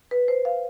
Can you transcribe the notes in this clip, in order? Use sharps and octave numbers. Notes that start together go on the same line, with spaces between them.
B4
C5
F5